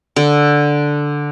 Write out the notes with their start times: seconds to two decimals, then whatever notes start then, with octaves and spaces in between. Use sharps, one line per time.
0.16 D3